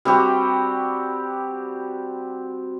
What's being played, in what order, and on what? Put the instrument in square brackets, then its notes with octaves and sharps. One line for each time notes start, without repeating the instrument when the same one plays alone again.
[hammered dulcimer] G3 C4 F#4 G4